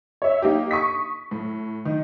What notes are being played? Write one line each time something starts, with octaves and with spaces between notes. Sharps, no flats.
C#5 E5
A#3 D#4 G4
C#6 D#6 B6
A2
D#3